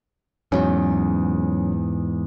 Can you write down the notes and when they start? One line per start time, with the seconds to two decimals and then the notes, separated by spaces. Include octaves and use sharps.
0.52 E2 G#2 F#3 C#4